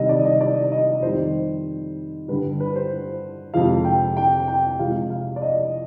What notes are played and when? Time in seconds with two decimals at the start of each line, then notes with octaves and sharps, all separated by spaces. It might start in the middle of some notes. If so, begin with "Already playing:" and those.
Already playing: C3 D#3 G3 D#5
0.09 D5
0.25 D#5
0.41 D5
0.72 D#5
1.02 F2 D#3 G3 C5
2.28 G2 D3 G3 B4
2.60 B4
2.76 C5
3.54 F2 C3 F3 G#3 F5
3.85 G5
4.17 G5
4.48 G5
4.79 C3 F3 G#3 F5
5.10 F5
5.36 D5
5.42 D#5